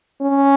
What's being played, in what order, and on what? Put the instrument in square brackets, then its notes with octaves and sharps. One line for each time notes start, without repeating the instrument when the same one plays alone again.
[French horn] C#4